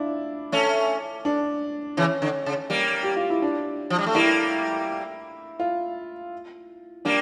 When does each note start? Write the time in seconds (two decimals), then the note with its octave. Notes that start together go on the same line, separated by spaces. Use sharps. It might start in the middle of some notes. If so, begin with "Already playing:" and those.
Already playing: D4 E4 F4
0.52 A3 C#4
1.25 D4
1.97 C#3 E3 C#4
2.22 D3
2.46 C#3
2.70 G3 A#3
3.03 G4
3.17 F4
3.30 E4
3.42 D4
3.90 F3
3.99 G3
4.06 A3
4.15 G3 A#3 E4
5.60 F4
7.05 G3 A#3 D4